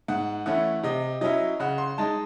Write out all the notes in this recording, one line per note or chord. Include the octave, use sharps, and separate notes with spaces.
G#2 F#5
E3 A3 C#4 E4 F#5
C3 D#5
F#3 C#4 E4 D#5
C#3 F#5
C6
G#3 D#4 A5